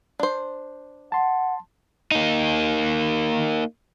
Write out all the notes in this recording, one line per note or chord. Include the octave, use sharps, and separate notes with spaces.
D4 C5
F#5 A5 C6
A#3 D#4